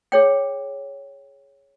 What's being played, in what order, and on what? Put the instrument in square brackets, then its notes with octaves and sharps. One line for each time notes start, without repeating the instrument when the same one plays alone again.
[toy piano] G#4 C#5 G5